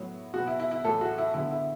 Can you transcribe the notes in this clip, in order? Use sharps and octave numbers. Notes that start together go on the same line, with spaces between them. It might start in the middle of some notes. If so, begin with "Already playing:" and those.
Already playing: A2 F#3 B3
B2 B3 F#4
E4
E4
E4
A2 E3 A3 A4
F#4
E4
D3 B3 E4
E4